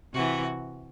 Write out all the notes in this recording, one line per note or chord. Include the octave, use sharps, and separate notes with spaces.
C3 E3 F#4